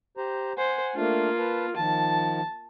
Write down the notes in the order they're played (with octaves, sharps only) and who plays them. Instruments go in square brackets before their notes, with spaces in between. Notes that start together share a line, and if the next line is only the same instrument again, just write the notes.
[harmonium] G4 C5 A#5
[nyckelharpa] C5 [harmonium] F#5 G#5
[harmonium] A3 D4 [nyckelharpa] A#3 F4
[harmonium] B4 A5
[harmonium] D#3 F3 [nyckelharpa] A5